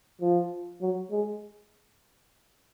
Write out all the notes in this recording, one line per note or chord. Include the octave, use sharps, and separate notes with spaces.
F3
F#3
G#3